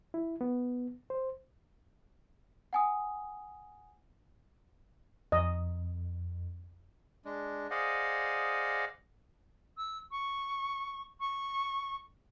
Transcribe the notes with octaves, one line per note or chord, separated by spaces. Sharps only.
E4
B3
C5
F#5 G#5 D#6
F2 D#5
G#3 D4
G#4 C5 D5 D#5 F5 F#5
E6
C#6
C#6